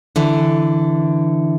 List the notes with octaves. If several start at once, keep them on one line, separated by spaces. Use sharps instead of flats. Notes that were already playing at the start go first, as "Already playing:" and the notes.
D3 E3